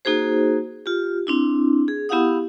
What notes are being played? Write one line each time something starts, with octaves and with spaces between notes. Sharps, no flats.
A#3 D#4 F#4 G#4 C5
F4 G4
C4 D4 E4
G#4
B3 E4 G4 F5 F#5 D#6